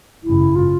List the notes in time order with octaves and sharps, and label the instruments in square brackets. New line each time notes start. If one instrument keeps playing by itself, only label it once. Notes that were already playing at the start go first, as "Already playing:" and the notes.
[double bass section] G#1 F#2 C#3 [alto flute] E4
[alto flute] F4